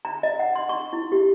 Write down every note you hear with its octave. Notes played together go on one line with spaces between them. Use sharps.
A#5
D#5
F#5
C6
C#6
E4
G4